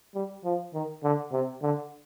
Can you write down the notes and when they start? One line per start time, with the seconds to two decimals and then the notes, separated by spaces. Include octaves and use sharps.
0.15 G3
0.44 F3
0.74 D#3
1.04 D3
1.32 C3
1.62 D3